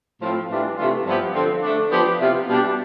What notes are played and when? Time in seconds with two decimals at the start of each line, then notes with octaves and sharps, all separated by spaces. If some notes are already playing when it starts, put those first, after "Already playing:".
0.20 A2 F3 C4 F4
0.49 A2 E3 G3 D4 F4
0.77 C3 E3 A3 D4 F4
1.05 G2 F3 B3 E4 G4
1.34 D3 F3 C4
1.62 D3 A3 D4
1.90 F3 B3 D4 G4
2.19 C3 E3 B3 F4
2.48 B2 G3 D4 G4